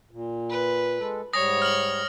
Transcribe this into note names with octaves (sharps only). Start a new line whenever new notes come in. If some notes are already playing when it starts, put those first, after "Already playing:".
A#2
B4
G#3 A4
G#2 G3 C#5 D#6 A#6
F6 F#7